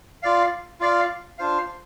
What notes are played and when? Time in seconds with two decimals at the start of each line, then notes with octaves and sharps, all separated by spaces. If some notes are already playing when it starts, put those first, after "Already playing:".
0.23 F4 D5 F5
0.80 F4 D5 F5
1.38 D4 F4 C5 F5